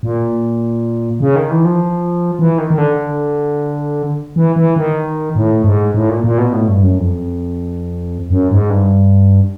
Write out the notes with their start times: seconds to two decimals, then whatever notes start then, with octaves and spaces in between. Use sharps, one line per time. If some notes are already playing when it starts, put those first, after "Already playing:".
0.03 A#2
1.20 C#3
1.36 D#3
1.51 E3
1.65 F3
2.39 E3
2.58 D#3
2.70 D#3
2.78 D3
4.36 E3
4.56 E3
4.76 D#3
5.36 A2
5.64 G#2
5.94 A2
6.10 A#2
6.24 A#2
6.38 B2
6.53 A2
6.68 G2
6.83 F#2
6.98 F2
8.30 F#2
8.51 G#2
8.70 G2